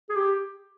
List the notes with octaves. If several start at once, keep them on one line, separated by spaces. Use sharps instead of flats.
G#4
G4